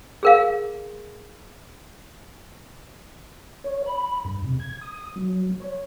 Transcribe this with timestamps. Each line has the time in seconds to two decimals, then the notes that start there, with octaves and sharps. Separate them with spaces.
0.23 G#4 A#4 F5
3.64 C#5
3.86 B5
4.25 G2
4.44 C3
4.60 G#6
4.81 D#6
5.16 F#3
5.60 C#5